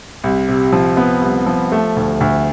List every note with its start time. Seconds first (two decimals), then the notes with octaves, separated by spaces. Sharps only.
0.24 C2
0.49 C3
0.73 F3
0.97 B3
1.22 C2
1.46 F3
1.72 A3
1.96 D2
2.20 D2